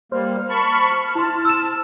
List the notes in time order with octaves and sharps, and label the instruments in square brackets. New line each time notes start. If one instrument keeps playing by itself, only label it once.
[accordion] G3 A#3 [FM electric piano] C5 [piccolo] F6
[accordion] A5 B5 C#6
[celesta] E4 C6 [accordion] A5
[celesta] E6 E7